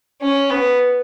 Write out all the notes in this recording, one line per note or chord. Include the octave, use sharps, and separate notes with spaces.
C#4
B3